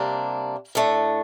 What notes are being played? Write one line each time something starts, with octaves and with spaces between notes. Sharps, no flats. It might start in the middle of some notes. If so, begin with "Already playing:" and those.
Already playing: C3 G3 A#3 D4
A2 A3 D4